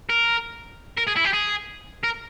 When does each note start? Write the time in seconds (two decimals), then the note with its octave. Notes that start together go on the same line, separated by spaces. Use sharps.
0.10 A#4
0.97 A#4
1.07 G#4
1.16 E4
1.24 G4
1.33 G#4
2.04 A#4